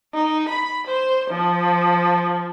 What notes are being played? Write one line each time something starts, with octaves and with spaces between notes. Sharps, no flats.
D#4
B5
C5
F3